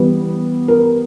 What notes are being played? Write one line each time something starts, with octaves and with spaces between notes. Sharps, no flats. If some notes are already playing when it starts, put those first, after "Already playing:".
Already playing: E3 G3 B3
A#4